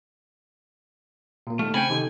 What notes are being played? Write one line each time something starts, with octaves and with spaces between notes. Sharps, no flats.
A#2 A#3
D#2 A3 F6
C#3 C4 G5 G#5 B5 C#7
C3 D#3 A4